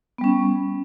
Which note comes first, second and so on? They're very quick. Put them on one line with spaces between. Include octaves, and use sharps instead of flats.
B3 G3 C#4